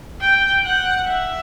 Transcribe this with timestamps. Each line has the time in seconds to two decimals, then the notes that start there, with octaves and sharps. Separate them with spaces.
0.21 G5
0.64 F#5
1.07 E5